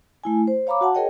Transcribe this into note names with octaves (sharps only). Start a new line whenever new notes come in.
A3 E4 G#5
C5
C#5 F5 A#5 B5 D6
F#4 F#5 A5
G#4 A#4 C#5 D#5 G5